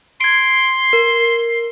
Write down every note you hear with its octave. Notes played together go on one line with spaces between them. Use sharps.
C6 G#6 D7
A#4